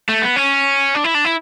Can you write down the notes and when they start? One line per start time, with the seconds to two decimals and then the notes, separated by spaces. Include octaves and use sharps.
0.09 A3
0.22 B3
0.36 C#4
0.95 D4
1.04 E4
1.14 D4
1.25 E4